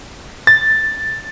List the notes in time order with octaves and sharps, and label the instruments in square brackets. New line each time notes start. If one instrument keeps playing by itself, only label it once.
[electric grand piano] A6